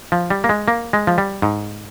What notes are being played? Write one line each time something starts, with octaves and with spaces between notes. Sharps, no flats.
F3
G3
A#3
G#3
A#3
G#3
F3
G3
G#2